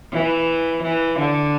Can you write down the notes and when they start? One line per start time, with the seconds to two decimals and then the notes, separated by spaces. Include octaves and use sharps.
0.12 E3
0.82 E3
1.18 D3